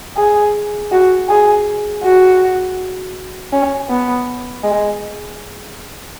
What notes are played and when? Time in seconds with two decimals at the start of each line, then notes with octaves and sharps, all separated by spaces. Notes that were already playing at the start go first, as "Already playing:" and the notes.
0.17 G#4
0.91 F#4
1.29 G#4
2.03 F#4
3.53 C#4
3.89 B3
4.63 G#3